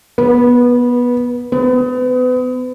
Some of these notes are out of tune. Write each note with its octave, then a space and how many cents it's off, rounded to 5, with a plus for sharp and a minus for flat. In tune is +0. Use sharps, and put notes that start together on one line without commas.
B3 -15
B3 +35